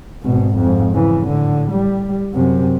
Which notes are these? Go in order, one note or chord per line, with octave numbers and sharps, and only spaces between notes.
G#1 B2
F2 G#2
C#3 E3
A2 D3
G3
F#2 C3